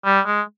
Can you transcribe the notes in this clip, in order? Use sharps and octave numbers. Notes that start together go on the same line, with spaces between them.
G3
G#3